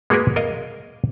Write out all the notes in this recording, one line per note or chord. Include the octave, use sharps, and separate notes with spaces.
G#3 A#3 F#4 G#4 A#4 B4
A#4 D#5 F5